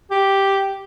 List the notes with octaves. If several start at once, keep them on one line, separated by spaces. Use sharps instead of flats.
G4